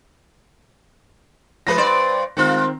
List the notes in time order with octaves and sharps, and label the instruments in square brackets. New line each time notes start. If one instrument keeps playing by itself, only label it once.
[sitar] F3 G#3 [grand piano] B4 A#6
[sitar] G2 C5 D5
[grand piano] D#3 C4 [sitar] G#3 F4